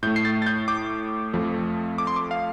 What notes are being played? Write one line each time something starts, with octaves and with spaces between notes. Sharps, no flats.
A2 A3 G6
C7
A6
A6
G6
D6
F2 F3 A3
D6
C6
D6
F5